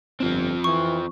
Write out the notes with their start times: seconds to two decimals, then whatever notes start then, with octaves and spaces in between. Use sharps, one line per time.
0.21 G1 F3 C4
0.64 E3 C#6